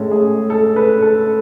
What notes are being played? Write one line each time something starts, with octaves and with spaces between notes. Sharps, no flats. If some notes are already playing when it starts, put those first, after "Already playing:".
Already playing: A2 G#3 C#4 A4
G#4
A4
B4
A4